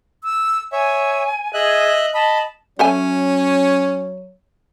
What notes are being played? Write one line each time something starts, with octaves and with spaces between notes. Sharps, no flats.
E6
C#5 E5 G#5
G#4 D#5 E5 F#6
D#5 A5 B5
F#3 C#4 A4 C#5 E5 G#5